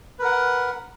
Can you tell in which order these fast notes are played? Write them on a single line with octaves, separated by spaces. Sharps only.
B4 A#4 F#5